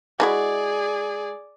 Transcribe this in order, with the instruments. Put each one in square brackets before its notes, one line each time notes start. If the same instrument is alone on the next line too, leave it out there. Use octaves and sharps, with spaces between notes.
[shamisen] G#3 E4 F#4 [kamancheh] G#4 D5